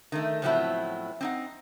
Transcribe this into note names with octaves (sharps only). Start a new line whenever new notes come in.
D#3 A3
A2 F3 F#3 B3 C4 E4
C4 D#4 F#5